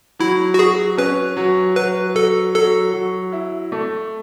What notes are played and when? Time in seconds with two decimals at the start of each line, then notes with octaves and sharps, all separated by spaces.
0.19 F#3 E4
0.54 F#4
0.59 F#3 G#4
0.98 C#4 B4
1.37 F#3
1.76 F#3 B4
2.15 F#3 A4
2.55 F#3 A4
2.93 F#3
3.32 E4
3.72 A3